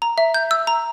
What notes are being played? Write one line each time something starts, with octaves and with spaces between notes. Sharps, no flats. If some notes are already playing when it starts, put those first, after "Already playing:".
A#5
E5
G6
E6
A#5